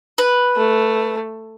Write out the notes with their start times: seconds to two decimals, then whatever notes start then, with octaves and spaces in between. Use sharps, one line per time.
0.18 B4
0.56 A3